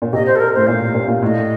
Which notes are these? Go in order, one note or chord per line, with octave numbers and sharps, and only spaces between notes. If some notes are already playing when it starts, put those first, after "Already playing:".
A#2
C3 D#5
C5
A4
A#4
A2 C5
A#2 F5
A#2
A#2
A2 D#5